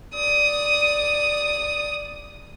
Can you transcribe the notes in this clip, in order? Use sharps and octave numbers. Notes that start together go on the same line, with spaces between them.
D5 D#6